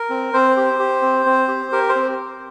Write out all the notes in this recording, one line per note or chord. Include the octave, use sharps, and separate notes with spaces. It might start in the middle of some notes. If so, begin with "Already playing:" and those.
Already playing: A#4
C4
C4 C5
G4
G4
C4
C4
G4
G4 A#4
C5
C4